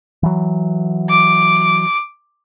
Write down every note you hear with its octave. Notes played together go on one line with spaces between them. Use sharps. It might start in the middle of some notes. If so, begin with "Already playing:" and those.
E3 F#3
D6